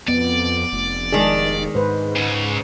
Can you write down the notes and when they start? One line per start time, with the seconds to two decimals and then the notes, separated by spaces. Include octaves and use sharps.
0.08 F2 B3 D5
0.72 F1
1.12 D#3 G#3 D4 G#4
1.75 G#2 B4 C5
2.16 C#2 C#3